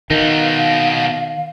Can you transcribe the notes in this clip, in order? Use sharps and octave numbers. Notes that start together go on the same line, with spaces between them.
B2 D#3 D#4 F5